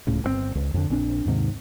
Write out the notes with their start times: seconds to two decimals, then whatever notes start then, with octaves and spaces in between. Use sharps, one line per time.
0.07 D1 C#2 A2 C#3
0.23 G1 D3 C4
0.55 C#2
0.74 F2 D3
0.90 A#1 C4 D4
1.26 D#2 G#2 C3 D#3